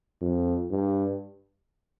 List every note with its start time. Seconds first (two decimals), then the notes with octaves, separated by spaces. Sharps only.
0.21 F2
0.71 G2